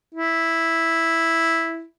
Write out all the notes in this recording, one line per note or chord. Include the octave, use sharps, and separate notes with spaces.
E4